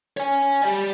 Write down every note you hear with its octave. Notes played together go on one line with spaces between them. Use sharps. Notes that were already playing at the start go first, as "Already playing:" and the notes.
C#5 G#5
G3 D5